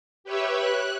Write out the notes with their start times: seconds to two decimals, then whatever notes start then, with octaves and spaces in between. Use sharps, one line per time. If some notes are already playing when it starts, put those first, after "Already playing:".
0.24 G4 B4 C#5 E5
0.55 F#6